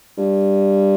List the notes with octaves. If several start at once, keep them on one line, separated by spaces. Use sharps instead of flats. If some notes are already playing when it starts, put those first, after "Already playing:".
G2